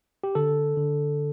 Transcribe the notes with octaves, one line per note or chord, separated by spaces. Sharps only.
G4
D3 A4
D3